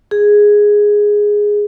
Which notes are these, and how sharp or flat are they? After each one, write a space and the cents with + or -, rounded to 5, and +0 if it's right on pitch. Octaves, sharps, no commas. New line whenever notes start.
G#4 -5